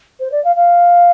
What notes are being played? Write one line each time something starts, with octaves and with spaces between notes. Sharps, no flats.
C5
D5
F5
F5